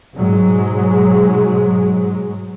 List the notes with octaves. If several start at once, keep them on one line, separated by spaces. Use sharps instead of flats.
G#2 B2 F#3 G#3